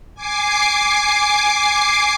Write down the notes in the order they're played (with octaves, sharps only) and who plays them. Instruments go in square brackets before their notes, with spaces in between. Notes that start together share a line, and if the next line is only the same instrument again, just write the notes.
[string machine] G#5 D6 C7